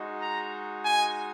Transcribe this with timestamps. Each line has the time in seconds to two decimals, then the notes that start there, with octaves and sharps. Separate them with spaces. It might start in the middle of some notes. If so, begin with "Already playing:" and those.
Already playing: G#3 D#4 F#4
0.22 A#5
0.85 G#5